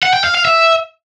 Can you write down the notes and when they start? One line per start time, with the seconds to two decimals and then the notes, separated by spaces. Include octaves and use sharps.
0.02 F#5
0.13 G5
0.24 F5
0.34 F5
0.45 E5